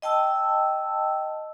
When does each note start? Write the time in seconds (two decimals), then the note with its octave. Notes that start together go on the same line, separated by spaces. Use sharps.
0.02 D#5 G5 A5 E6